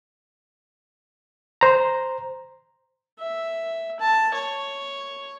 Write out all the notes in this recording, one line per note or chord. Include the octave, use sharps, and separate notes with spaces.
C5 A#5
E5
A5
C#5